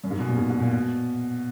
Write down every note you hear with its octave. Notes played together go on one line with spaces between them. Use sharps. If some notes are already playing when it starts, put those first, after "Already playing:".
F#2
G#2
B2
A#2
G#2
G#2
A#2
B2